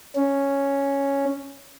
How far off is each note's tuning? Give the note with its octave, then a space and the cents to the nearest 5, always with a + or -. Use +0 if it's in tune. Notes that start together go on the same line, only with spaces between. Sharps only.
C#4 +0